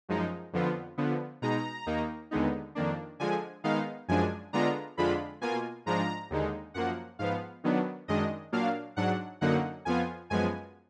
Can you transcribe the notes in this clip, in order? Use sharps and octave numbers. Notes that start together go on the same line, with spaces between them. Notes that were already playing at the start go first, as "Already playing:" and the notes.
F#2 F3 G#3 D#4
F2 D3 F3 B3 F4
D3 F3 B3
B2 G#3 D#4 A#5
D#2 D#3 A#3 D#4
D#2 D3 G#3 B3 D#4
F2 D#3 A#3 D4
D3 F3 G#3 G#5
D#3 G#3 B3 D#4 F5
F#2 F3 G#3 D4 G#5
D3 G#3 B3 D4 F4 A#5
F2 D3 G#3 D4 F4 B5
B2 A#3 F4 G#5
G#2 F3 G#3 D4 F4 A#5
D#2 D3 G#3 D#4
F#2 F3 A#3 F#5
G#2 F3 B3 F5
D#3 F#3 B3 D4
F#2 D#3 G#3 D4 D#5
A#2 F#3 A#3 D4 F5
G#2 F#3 D4 F#5
F#2 D3 F#3 A#3 D#4 F#5
F2 F3 B3 F4 G#5
F#2 F3 G#3 B3 G#5